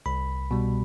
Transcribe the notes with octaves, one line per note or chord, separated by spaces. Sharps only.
C2 B5
B2 G3